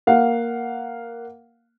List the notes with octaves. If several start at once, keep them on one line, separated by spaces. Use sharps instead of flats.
A#3 F5 F#5